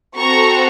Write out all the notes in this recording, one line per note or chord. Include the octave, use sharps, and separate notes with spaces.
C4 F#4 A4 A#5 C#6